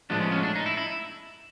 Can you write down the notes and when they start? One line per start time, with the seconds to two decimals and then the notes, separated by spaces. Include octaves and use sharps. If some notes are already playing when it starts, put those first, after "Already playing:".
0.10 A2 F3 G#3 B3 D4
0.21 C#4
0.32 C#4
0.43 D4
0.55 D#4
0.66 E4
0.77 E4